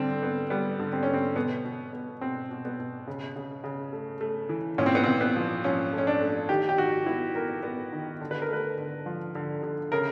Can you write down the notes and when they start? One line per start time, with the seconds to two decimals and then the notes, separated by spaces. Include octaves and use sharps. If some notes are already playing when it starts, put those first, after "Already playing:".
Already playing: D3 G3 C4
0.23 B3
0.50 G3 B3
0.79 D3
0.93 C4
1.03 B3 C#4
1.14 C4
1.36 B2 B3
1.65 B2
1.93 B3
2.21 B2 C4
2.51 B2
2.65 B3
2.79 B2
3.07 C#3
3.36 C#3
3.64 C#3
3.93 A3
4.21 A3
4.49 E3
4.78 A#2 C#4
4.86 C4
4.95 B3
5.04 A#2 C4
5.21 B3
5.36 F3
5.64 F3 C#4
5.93 A3
5.98 C#4
6.07 D4
6.21 A3
6.49 D#3 G4
6.69 G4
6.77 D#3 F#4
7.06 B3 E4
7.35 B3 A#4
7.63 B3
7.93 D#3
8.21 D3
8.31 B4
8.42 A#4
8.49 A3 B4
8.78 D3
9.06 F3
9.35 D3
9.63 D3
9.92 C#3 A#4